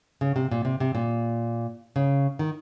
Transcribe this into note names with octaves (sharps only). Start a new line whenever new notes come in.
C#3
C3
A#2
C3
C3
A#2
C#3
D#3